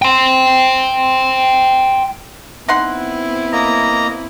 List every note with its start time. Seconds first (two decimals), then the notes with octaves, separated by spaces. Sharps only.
0.02 G5 C6
2.68 B3 C4 D#4 E4 F#5 C6
3.53 A#3 D#5 A#5